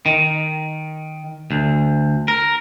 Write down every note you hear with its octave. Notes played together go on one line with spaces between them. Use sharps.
D#3
D2
A#4